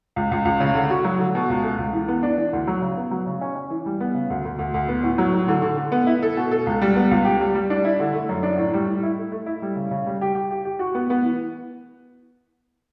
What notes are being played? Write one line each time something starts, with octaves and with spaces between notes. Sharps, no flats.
C#2
C#2
C#2
C#3
D3
F#4
F#3
D3
B2
C#2
A3
C#2
E3
B3
D4
E3
D2
F#3
C#3
B3
F#3
C#3
C#4
C#4
E3
G3
B3
C#3
D2
D2
D2
D2
B3
A2
F#3
A2
D3
D3
D3
B3
E4
A4
B2
A4
C#2
G3
B3
C#2
G4
G3
G3
D4
E4
D3
A3
F#2
D4
A2
G3
A2
E4
A3
A3
E4
G3
C#3
C#3
G3
G4
G4
G4
G4
F#4
B3
B3
E3